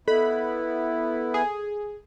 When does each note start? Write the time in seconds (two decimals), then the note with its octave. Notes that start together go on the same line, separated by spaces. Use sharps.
0.08 B3 E4 A4 B5
1.34 G#4